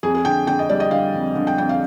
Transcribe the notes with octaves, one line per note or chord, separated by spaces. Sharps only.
F2 G#4
G#4
D3 G5
D3 G5
D#5
G3 D5
D#5
D3 F5
F2
D3
G5
F2 G5
F5